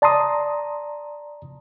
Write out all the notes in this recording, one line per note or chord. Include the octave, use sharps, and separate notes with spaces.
D5 A5 A#5 C6 D#6